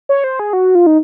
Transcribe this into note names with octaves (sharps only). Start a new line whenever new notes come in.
C#5
C5
G#4
F#4
F4
D#4